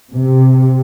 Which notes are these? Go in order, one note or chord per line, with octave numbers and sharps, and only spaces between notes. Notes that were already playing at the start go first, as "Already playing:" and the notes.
C3